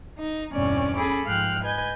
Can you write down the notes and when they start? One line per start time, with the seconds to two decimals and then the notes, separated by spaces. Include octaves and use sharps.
0.19 D#4
0.52 E2 G2 B2 C4 C#4 D5
0.96 C#4 G#4 A4 B5 D6
1.25 G#2 F3 F5 G5 F6 F#6
1.63 B4 D#5 G#5 G6 G#6